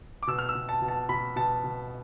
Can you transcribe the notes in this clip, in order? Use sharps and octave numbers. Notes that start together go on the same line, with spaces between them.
D6
B2 E6
F6
E6
B2
A5
B2
A5
B2 B5
B2 A5
B2